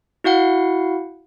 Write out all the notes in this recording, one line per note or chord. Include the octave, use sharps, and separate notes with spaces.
E4 F#4 F5 F#5